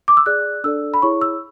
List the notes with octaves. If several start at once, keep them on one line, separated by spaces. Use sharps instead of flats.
D6
E6
G#4 D5 F#6
D4 A4 D5 E6
B5
E4 G#4 C#5 C#6
E6